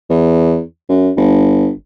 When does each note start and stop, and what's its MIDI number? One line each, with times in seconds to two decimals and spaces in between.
0.10 0.61 40
0.89 1.11 42
1.17 1.70 31